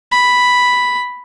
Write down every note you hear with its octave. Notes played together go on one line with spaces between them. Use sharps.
B5